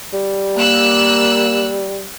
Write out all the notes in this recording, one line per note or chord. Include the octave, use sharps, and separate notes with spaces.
G3
A#3 E6 F#6